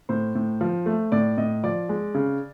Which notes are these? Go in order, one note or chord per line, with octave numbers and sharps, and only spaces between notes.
A2 C5
A2
F3
A3
A2 D5
A2 D#5
F3 D5
G#3
C#3